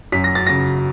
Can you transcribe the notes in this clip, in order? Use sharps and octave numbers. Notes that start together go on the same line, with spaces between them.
F#2 B6
A#6
A6
C#3 A#6